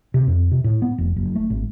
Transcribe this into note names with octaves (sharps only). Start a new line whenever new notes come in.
C3
F2
C3
A2
B3
F1
F#1
A3
G#1